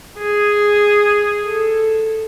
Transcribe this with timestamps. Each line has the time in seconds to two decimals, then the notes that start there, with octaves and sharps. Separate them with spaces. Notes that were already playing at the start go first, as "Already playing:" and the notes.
0.18 G#4
1.43 A4